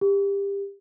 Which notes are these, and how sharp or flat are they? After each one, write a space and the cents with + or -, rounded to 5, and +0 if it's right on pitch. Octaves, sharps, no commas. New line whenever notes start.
G4 +25